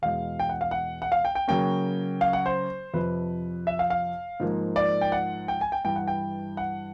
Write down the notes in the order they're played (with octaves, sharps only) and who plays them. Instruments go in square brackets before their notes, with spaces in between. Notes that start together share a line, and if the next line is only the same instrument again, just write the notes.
[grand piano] E2 B2 G#3 F5
G5
F#5
F5
F#5
F#5
F5
G5
G5
C#3 F#3 A#3 C#4 G5
F5
F#5
C5
F2 C3 F3 B4
E5
F5
F5
G#2 F3 A#3
D5
G5
F#5
G5
G#5
G5
G2 E3 G3 G5
F#5
G5
F#5